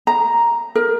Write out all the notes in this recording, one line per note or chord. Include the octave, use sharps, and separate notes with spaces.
A#5
A#4